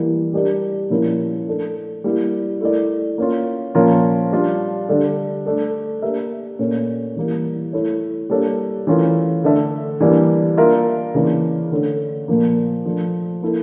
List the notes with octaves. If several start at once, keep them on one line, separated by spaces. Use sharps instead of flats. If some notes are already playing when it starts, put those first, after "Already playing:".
Already playing: E3 G3 A#3 E4
G3 D4 G4 A#4 D5
A#2 F3 C#4 E4 A#4
A3 D4 A4
G3 A#3 E4
A3 E4 A#4 D5
A#3 C#4 F4
A#2 F3 C#4 F4 A#4
G3 D4 F4
D3 G3 D4 A4
A3 D4 A4
A#3 D4 G4 A#4 E5
A#2 A3 C#4
E3 G3 A#3 E4
A3 E4 A4 C#5
G3 A#3 D4 A4 C#5
E3 A3 C#4 F4 A#4
D3 A3 D4 A4 E5
E3 G3 A#3 D4
A#3 D4 F4 A#4 E5
C#3 E3 A#3 D4
D3 A3 C#4
A#2 F3 A#3
F3 A3 D4
A#3 E4 A4